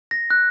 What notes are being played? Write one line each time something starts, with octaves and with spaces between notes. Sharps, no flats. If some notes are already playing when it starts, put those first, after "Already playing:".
A#6
F#6